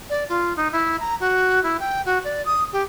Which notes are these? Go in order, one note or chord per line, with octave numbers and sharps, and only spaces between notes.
D5
F4
D#4
E4
A#5
F#4
E4
G5
F#4
D5
D#6
G4